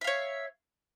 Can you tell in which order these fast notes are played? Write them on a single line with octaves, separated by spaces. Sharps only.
E5 F5 C#5